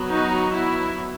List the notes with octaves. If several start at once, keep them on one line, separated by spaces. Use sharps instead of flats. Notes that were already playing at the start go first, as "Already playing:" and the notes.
Already playing: F#3 B3
D#4 F#4
E4